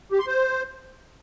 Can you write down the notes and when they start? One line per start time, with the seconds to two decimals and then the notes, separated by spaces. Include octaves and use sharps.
0.12 G4
0.20 C6
0.27 C5